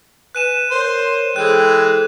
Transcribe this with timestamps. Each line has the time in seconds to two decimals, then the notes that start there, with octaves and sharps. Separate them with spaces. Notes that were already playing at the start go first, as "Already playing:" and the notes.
0.35 B4 G#5 F#6 D#7 E7
0.71 A#4 C5 C#5
1.36 E3 G#3 G#4 A4 C5 G5 F#6